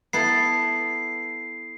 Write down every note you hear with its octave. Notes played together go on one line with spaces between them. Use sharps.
B3 E4 A4 C7